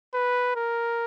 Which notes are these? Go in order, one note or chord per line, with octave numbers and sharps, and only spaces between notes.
B4
A#4